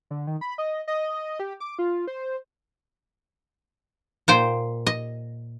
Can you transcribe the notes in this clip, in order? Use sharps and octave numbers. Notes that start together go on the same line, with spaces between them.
D3
D#3
B5
D#5
D#5
G4
D6
F4
C5
A#2 C5 G5
D#5